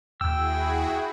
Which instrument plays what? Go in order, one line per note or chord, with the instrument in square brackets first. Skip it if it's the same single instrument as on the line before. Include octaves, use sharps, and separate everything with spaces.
[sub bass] D#2 [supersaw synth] E4 F#4 G#4 [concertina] G5 [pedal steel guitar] E6